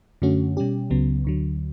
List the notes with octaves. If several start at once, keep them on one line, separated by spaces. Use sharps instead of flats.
F#2 D3 A3 C#4 F#4
B2 G3 C#4 G4
C#2 C#3 F#3 B3
D2 D3 F#3